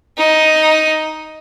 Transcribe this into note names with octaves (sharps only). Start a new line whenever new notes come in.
D#4